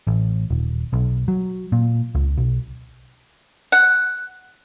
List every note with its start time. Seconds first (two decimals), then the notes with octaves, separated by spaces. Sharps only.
0.07 A1
0.50 D#1
0.93 B1
1.28 F#3
1.72 A#2
2.15 C#2
2.38 B1
3.72 F#5